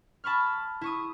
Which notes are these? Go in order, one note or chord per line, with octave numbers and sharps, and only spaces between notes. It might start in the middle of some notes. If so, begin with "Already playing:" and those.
A5 B5 C#6 F6
E4 C#6 D#6